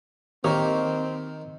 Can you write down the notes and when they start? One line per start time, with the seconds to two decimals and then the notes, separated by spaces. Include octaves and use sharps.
0.44 D#3 A#3 C4 G4 C#5